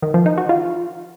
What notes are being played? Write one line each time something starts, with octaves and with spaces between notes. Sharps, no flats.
D#3
F3
D#4
F#4
F4